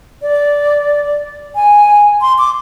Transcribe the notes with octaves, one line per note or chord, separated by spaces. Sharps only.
D5
G#5
C6
D6